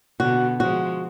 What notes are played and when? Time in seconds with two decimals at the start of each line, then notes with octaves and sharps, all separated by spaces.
0.20 B2 D3 B3 F#4
0.60 F3 G#3 F#4